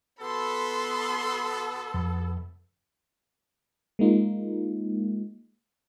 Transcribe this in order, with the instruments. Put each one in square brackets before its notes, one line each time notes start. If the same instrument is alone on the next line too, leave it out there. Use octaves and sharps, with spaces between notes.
[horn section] B2 B3 A4 [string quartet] B5 C6
[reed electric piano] F2
[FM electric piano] G#3 A#3 D#4 F4